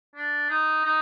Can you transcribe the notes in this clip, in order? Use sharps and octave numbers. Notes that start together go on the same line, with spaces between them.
D4
D#4
D#4